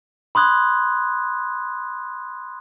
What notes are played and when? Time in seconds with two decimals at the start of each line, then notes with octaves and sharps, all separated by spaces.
0.35 B5 C6 D#6 F#6 G#6